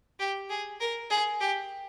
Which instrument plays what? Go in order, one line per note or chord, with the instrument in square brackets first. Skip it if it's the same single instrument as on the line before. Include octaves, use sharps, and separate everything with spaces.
[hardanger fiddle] G4
G#4
A#4
G#4
G4